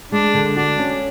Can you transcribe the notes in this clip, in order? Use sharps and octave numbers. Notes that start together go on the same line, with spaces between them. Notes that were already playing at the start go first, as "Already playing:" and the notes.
G#3 D4
D3
D4 F#4
C#4